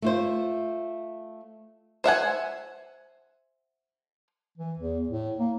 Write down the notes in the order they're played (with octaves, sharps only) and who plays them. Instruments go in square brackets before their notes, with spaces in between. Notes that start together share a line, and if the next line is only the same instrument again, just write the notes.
[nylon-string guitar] A3 F4 C5
[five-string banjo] C5 E5 F#5 G#5
[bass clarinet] E3
E2
A2
A#3